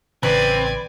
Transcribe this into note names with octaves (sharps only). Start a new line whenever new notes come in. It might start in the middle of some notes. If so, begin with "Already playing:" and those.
A1 C#3 E3 C4 B4 D5 G#5